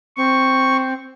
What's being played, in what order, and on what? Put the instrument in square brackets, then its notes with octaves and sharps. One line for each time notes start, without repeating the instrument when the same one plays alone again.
[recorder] C4 [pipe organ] C#6